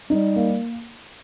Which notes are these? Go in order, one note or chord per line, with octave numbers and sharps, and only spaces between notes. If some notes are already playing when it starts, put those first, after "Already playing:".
G3 D#4
A#3